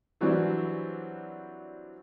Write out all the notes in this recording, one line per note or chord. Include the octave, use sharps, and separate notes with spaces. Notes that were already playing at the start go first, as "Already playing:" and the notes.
E3 F#3 G3 C4 D4 E4